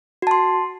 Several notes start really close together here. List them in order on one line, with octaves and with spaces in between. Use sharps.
F#4 A5 C6